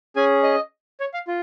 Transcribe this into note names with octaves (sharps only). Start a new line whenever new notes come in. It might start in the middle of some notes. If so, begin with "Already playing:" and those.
C#4 G#4 G#5
D#5
C#5
F5
F4